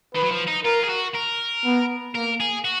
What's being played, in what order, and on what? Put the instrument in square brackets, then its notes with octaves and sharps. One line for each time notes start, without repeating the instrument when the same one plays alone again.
[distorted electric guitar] D#3 [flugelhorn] B4
[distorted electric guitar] F#3
F3
D#4
[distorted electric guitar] F4 [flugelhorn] A#4
[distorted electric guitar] G#4
F#4
A#4
[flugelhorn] B3
[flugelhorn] A#3 [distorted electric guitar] A#4
[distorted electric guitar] G#4
F#4